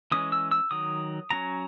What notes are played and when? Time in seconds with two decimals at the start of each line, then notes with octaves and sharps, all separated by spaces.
0.12 E3 G#3 C#4 D#6
0.32 E6
0.51 E6
0.71 D#3 F#3 D#6
1.31 F#3 C#4 A#5